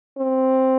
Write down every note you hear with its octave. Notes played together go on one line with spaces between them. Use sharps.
C4